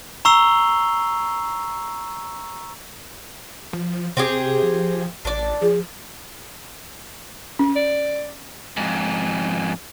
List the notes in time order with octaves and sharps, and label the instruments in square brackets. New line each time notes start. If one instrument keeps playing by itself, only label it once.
[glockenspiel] A#5 C#6 E6 C7 F7 G7
[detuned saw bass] F3
[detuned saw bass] C3 [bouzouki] C4 G4 G#4
[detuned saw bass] F3
[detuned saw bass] A1 [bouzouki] D4 D5
[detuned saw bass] F3 [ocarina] G#4
[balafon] C#4
[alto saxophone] D5
[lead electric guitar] F2 G#2